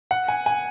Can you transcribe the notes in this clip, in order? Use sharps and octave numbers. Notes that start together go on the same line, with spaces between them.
F#5
G#5
G#5